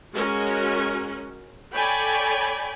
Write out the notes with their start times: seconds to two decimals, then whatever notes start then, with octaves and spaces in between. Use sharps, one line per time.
0.12 G#3 C#4 F#4 A#4
1.73 A4 C#5 D5 G5 G#5 B5